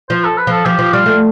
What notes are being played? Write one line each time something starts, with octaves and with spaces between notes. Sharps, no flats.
F3 C5
A4
B4
F3 A4
F3 G4
F3
G3 F4
A3